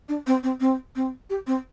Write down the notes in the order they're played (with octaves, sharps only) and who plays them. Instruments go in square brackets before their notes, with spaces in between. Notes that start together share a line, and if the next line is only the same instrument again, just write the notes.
[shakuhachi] D4
C4
C4
C4
C4
G4
C4